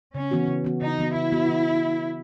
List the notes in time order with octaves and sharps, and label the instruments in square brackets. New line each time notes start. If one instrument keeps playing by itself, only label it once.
[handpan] C#3 [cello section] C#4
[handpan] E3 B3 F#4
C#3
E3 B3 F#4
[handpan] C#3 [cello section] D#4
[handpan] E3 B3 F#4
[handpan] C#3 [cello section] E4
[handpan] E3 B3 F#4
E3